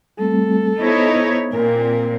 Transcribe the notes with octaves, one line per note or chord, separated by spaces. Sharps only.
G3 A3 C4 A4
B3 D#4 E4 C5 C#5
A#2 C4 A#4 G#5